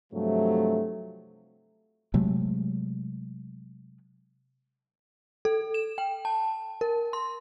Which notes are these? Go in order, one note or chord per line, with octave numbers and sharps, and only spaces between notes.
G2 C3 F3 F#3 A3
C3 F#3 G#3 A3
A4
E7
G5
A5
A#4
C6